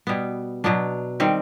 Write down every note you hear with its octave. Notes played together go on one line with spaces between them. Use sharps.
B2 G3 B3
B2 F#3 B3 D4
D#3 G3 C4